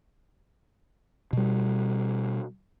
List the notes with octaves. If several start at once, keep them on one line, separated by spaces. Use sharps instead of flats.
B2 G3